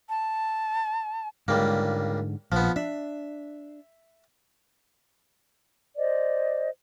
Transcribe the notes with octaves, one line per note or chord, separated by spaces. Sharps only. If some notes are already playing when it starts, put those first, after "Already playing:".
A5
C#2 G#2 D3 G3 A#3
A#1 F3 B3
D4 E5
C5 D5 D#5